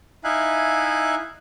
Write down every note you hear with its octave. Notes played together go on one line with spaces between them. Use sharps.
D#4 E4 E5 F5 G#5 F#6